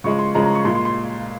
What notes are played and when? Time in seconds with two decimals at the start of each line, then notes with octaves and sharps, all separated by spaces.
0.04 C#3 F3 G#3 C#6
0.19 C6
0.35 C#3 F3 G#3 A#5
0.45 A#5
0.55 C#6
0.65 A#2 C6
0.68 G#3
0.75 C6
0.85 C6